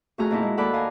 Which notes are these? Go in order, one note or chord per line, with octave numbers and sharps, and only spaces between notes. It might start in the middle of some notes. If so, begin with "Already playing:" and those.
F2 A3 F#4 G#4 A#5 F6
F2 A#2 D#4 E4 F#5
G#3
D#2 A4 D5 F#5 B5
F5 G#5 A#5